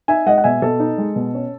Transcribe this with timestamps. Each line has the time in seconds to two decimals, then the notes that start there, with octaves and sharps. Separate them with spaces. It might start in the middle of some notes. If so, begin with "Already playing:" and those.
0.08 D#4 E5 G#5
0.26 G#3 D#5 F#5
0.38 F#5
0.44 B2 E5 G#5
0.62 B2 A4
0.80 D#4
0.98 G#3
1.16 B2
1.34 C#4